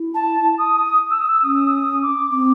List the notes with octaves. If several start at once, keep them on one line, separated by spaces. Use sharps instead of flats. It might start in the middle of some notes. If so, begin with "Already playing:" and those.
Already playing: E4
A5
D#6
E6
D#6
E6
C#4 D#6
E6
D#6
D6
C4 D6